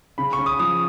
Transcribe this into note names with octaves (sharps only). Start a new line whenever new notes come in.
C#3 B5
C#6
C#4
D#6
F3 D#6